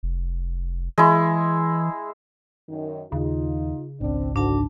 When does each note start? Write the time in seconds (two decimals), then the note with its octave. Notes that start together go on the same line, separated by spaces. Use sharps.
0.03 F1
0.98 E3 G#3 E4
2.69 F#2 D#3
3.12 D#2 C#3 D#4 F4
4.01 G#1 C#2 C4 D4
4.36 G#2 D3 D4 F#4 A5